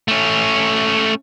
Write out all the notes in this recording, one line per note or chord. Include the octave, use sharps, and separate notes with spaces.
A3 C#4